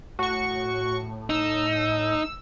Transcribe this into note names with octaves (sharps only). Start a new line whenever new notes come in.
A2 F#4 C#6
D#4 E6